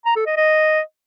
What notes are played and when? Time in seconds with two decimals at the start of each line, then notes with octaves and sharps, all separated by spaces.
0.06 A#5
0.16 A4
0.26 D#5
0.37 D#5